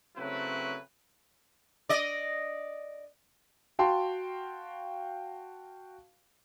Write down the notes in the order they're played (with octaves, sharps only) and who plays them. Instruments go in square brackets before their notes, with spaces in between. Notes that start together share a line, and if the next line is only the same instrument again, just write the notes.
[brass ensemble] C#3 F#3 A3 C4 E4 B4
[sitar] D5 D#5
[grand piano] F#4 F5 G5 A5 C6